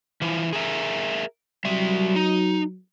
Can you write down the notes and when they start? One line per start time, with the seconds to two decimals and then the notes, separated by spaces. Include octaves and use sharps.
0.21 E3 F3
0.53 G#4 A#4 E5
1.65 F#3 G3 E5
2.16 D#4